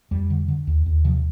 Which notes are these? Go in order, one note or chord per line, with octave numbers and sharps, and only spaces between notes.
F2 G3
D3
D3
D#2
D#2
C3 F3